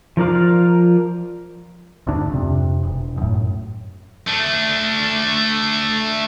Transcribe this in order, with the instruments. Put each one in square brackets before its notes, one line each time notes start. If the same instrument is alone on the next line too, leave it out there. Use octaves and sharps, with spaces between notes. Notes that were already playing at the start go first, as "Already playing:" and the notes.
[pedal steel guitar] F3 A#4 D5 F5
[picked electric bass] D2 G#2 D4
F2 C3
E1
F#2 A2
[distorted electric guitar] A3 D4